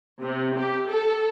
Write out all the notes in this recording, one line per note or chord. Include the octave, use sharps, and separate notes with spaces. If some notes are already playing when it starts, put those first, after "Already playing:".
C3
G4
A4